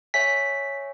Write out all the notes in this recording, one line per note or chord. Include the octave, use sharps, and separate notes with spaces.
C#5 E5 G#5 B6